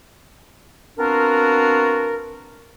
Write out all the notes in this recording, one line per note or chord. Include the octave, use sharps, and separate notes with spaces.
B3 C4 D4 F4 F#4 A#4